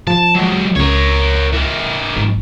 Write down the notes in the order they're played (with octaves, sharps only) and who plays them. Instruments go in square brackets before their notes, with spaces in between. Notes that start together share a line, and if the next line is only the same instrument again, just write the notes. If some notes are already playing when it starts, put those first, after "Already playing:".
[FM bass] F3 [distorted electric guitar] A5
[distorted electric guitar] F#3 G#3
[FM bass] C#2 [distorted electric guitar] A#4 C#5
[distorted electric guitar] E3 A#4
[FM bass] G#1